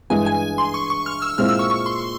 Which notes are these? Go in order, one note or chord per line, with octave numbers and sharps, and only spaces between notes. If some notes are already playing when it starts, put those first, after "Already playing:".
G2 E3 G#3 E4 G#5
G#5
C6
C#6
C#6
F6
E6
A#2 G#3 C4 E4 F6
E6
C#6
C#6
C6